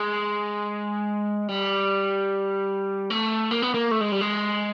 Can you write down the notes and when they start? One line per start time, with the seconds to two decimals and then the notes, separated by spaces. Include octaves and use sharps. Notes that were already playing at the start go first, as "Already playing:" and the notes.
Already playing: G#3
1.48 G3
3.10 A3
3.51 A#3
3.62 B3
3.74 A#3
3.91 A3
4.01 G#3
4.12 G3
4.21 G#3